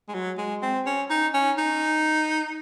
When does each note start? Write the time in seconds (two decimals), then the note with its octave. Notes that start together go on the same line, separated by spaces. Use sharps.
0.09 G#3
0.14 F#3
0.38 G#3
0.63 C4
0.86 C#4
1.10 D#4
1.34 C#4
1.58 D#4